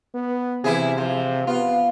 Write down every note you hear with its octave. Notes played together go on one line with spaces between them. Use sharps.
B3
C3 E3 E4 G#4
F3
B3 F4